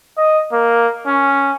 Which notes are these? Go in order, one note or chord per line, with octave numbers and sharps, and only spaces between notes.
D#5
A#3
C#4